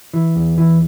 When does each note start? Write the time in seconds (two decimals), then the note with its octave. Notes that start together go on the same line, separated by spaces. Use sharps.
0.14 E3
0.36 E2
0.58 E3